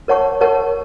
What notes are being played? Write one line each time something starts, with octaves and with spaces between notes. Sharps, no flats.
A#4 C#5 F#5 A5 C#6
A#4 C#5 F#5 A5 C#6